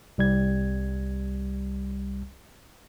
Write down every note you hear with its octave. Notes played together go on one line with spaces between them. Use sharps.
C2 G3 G#6